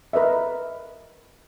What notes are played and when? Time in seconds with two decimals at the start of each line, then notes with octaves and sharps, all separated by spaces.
0.13 A#4 B4 D#5 E5